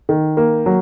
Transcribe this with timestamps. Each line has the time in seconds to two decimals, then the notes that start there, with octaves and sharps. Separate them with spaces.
0.09 D#3
0.37 A#3
0.66 F#3